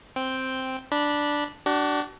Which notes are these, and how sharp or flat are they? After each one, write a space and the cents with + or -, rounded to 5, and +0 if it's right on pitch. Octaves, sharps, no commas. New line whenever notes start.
C4 +0 G5 +0
D4 +0 B5 -20
D4 +0 F#4 +40